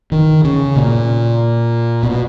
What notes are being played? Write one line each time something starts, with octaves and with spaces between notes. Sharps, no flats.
D#3
C#3
A#2
B2